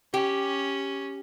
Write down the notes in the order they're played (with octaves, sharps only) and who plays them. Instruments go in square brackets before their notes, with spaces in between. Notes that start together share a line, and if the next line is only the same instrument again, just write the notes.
[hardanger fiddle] C#4 [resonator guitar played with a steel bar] G4